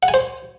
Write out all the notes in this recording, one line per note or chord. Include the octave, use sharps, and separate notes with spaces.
F#5
G#5
C5